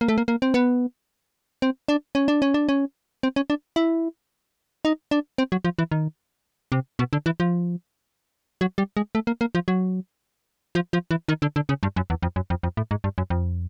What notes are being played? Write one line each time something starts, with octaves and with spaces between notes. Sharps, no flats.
A#3
A3
A#3
A#3
C4
B3
C4
D4
C#4
D4
C#4
D4
C#4
C4
C#4
D4
E4
D#4
D4
C4
F#3
F3
E3
D#3
C3
B2
D3
E3
F3
F#3
G3
G#3
A3
A#3
A#3
F3
F#3
F3
F3
E3
D#3
D3
D3
C#3
G2
F#2
E2
F2
F#2
F2
F2
A2
G#2
G2
F#2
F2